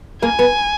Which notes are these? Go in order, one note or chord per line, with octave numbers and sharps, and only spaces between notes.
A#3 G#5
B3